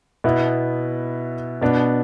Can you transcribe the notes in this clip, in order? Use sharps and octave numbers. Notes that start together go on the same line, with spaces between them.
B2 B3 E4
B2 B3 D4